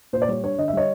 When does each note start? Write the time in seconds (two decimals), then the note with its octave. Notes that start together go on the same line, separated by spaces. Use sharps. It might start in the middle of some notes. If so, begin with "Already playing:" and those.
0.13 A#2 C5
0.22 D5
0.29 G3 C#5
0.44 D4 C#5
0.58 D3 D#5
0.68 E5
0.73 G3 C#5 D#5